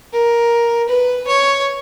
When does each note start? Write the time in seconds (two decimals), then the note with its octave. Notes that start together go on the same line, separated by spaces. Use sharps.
0.12 A#4
0.88 B4
1.27 C#5